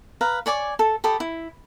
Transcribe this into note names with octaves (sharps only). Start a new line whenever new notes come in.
B4 F5 A#5
C#5 D5 G#5 D6
A4
G4 A4 B5 D#6
E4